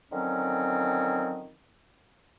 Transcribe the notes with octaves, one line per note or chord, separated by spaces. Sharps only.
D3 D#3 F3 F#3 C4 C#4